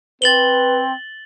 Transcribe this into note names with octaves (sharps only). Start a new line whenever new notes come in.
C4 B4 A6 F#7 G7